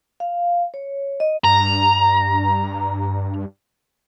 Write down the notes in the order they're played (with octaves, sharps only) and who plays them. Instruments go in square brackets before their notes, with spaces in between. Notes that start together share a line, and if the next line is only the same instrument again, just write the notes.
[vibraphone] F5
C#5
D#5
[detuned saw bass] G2 [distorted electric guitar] A#5